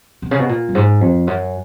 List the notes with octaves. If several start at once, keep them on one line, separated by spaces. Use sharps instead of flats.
B2
C#3
B2
A#2
F#2
G#2
F2
F#2